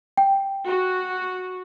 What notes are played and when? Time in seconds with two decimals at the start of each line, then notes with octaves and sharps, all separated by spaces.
0.17 G5
0.66 F#4